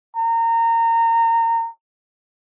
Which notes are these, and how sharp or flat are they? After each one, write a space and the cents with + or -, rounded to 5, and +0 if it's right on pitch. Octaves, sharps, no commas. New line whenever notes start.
A#5 -25